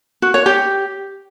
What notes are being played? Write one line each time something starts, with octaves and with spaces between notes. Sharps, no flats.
F#4
C#5
G4